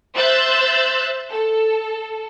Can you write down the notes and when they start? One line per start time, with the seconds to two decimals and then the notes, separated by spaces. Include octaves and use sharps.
0.15 C5 E5 E6 F#6 G6 A6
1.29 A4